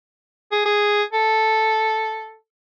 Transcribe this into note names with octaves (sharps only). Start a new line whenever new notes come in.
G#4
G#4
A4